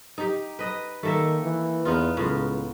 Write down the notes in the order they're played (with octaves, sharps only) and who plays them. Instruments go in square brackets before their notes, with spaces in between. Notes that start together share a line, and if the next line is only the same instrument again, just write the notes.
[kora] D#4 G4
B4 D#5
[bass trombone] D#3 [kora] A3 A#3 E5
[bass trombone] E3
[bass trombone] E2 [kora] B3 D#4 F4
[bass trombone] C#2 [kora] A2 F4